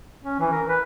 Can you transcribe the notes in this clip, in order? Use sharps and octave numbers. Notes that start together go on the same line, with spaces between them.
C#4
E3
A#4
B4